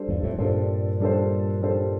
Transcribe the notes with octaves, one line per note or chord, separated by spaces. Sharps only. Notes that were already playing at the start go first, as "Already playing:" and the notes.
Already playing: G3 D4 A4 C5
E2 G2
F2 A2
G2 A#2 G3 D4 A4 C5
G3 D4 A4 C5
G3 D4 A4 C5